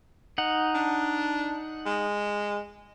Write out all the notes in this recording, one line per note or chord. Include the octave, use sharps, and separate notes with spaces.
D#4 F#5
D4
G#3